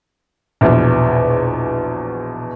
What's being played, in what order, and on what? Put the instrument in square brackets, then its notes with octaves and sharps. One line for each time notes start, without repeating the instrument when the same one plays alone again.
[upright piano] A#1 E2 B2